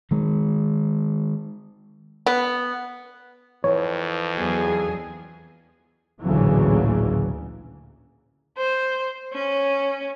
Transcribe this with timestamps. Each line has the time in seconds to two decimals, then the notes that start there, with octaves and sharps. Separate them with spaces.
0.11 D#3 G#3
2.26 B3
3.64 F2 E3 C#5
4.36 E2 F#3 G#4
6.22 A1 D2 A#2 C#3 E3 F#3
8.58 C5
9.33 C#4